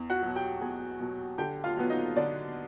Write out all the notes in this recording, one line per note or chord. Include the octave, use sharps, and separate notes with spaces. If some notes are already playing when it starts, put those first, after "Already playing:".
Already playing: E2
F#4 F#5
B2 F#3
G4 G5
E2 G#4 G#5
B2 F#3
D3 G4 G5
F4 F5
F#3 B3
D#4 D#5
D3 D4 D5